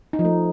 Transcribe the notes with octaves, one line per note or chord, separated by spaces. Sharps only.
D#4
F3
A3